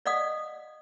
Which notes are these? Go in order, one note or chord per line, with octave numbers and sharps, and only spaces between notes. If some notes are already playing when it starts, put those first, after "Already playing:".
D5 D#5 F5 F#5 D#6